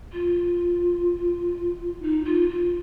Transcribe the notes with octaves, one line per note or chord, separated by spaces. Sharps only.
F4
D#4
F4
F4